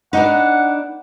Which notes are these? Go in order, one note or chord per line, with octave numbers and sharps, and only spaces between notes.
B3 D4 D#4 F#5